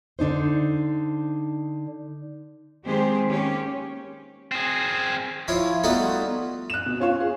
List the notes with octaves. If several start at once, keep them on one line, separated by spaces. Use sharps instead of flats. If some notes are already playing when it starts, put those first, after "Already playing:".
D3 D4 D#4 C5
D#3 G#3 C4 G4 G#4 C5
A#3 C#4 G4
C4 G#4
F3 E4 F4 C#5 F5
G3 A3 B3 D#4 F4 F#4
F#6 E7
B2
C#4 F4 C#5
G#4